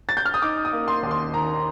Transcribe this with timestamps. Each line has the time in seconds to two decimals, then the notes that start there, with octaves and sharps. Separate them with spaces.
0.09 A6
0.17 G6
0.25 F6
0.34 D#6
0.42 D#4 D6
0.65 D#6
0.73 A#3
0.88 C6
1.03 D#2
1.11 C6
1.34 D#3 A#5